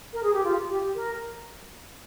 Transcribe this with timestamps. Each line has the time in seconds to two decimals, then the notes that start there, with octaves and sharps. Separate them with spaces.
0.13 A#4
0.23 G#4
0.33 G4
0.44 F4
0.69 G4
0.95 A#4